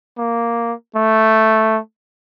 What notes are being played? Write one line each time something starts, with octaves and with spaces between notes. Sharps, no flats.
A#3
A3